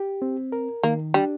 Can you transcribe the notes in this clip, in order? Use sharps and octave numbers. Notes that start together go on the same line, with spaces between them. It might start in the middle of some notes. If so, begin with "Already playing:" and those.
Already playing: G4
C4
A#4
D#3 A#3
G3 D4